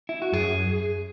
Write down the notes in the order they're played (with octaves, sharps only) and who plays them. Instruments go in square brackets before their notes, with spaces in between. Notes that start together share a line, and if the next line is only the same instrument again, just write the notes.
[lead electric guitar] E4
F#4
[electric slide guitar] F#2 [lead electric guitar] G#4